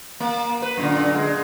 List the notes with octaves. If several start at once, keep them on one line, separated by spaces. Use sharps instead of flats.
A#3
B4
F#2 A#2 D3
G#3